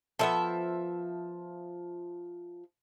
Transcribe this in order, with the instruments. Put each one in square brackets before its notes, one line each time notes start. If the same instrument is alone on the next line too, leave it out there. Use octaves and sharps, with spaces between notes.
[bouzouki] F3 E5 [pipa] B3 A4